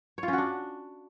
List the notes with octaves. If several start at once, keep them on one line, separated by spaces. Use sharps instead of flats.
C#5
F4
C#4
F#4
D4